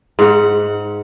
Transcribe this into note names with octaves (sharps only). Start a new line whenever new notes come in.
G#2 F#5